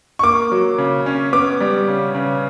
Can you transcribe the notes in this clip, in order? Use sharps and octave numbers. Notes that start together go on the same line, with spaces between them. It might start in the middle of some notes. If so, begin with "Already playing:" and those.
C#6
A#3 D6
F#3
C#3
C#4
B3 D6
G3
C#3
C#3